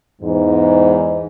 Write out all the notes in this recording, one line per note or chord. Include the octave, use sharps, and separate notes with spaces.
E2 G#2